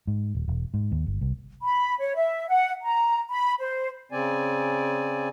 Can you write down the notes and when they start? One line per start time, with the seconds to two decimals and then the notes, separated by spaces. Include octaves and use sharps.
0.07 G#2
0.35 D#1
0.48 E1
0.74 G#2
0.92 D#2
1.07 G1
1.21 C2
1.62 B5
1.99 C#5
2.16 E5
2.49 F#5
2.82 A#5
3.30 B5
3.60 C5
4.12 C#3 C4 D5 G#5